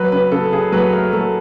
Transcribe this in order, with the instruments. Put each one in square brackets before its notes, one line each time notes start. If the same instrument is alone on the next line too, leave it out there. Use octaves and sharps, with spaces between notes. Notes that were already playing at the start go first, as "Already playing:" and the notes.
Already playing: [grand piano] F#3 B4
C#3 B4
C#3 A4
C#3 G#4
F#3 B4
A3 A#4
F#3 A4